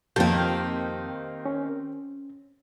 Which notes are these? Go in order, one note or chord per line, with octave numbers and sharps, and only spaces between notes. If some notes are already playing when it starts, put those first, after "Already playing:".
F2 D#3 A#3 C4 G4 A5 G6
C#4